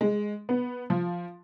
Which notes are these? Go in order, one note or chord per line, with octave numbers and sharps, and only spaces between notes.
G#3
B3
F3